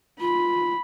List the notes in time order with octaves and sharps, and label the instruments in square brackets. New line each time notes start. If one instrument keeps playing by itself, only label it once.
[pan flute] F4 [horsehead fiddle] B5